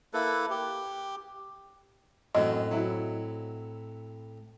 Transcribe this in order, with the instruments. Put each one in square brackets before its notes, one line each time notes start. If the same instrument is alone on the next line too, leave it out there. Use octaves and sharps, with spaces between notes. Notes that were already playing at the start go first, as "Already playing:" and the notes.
[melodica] A#3 E4 A4 B4
G4
[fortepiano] F#2 [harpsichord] A2 C4 [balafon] D#5
[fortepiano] F#3 E4